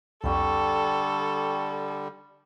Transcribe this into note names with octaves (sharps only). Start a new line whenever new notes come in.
C2 F2 D3 G3 A4 G5 C#6